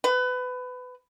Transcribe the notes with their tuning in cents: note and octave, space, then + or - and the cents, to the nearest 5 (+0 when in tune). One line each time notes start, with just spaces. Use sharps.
B4 +25